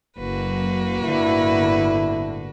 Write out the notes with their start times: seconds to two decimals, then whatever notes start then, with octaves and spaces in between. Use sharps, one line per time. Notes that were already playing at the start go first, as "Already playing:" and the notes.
0.18 F#1 A#3 F#4 B4
1.02 G1 A2 D3 E4